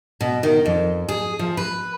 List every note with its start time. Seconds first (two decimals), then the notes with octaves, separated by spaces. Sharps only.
0.21 B2
0.43 D#3
0.65 F2
1.09 G#4
1.39 F3
1.57 B4